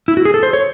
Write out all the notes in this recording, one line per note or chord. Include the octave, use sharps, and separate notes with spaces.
E4
F#4
G#4
A4
C5
C#5